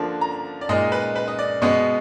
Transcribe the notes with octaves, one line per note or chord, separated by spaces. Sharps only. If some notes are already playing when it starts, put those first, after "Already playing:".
Already playing: D3 F3 A#3 D4
A#5
D5
A#2 G#3 D#4 D#5
B4
B4
D#5
D5
B2 G#3 B3 D#5